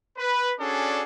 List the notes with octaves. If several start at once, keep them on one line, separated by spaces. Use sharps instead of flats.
B4
C#4 D4 F#4 G#4 A4 D5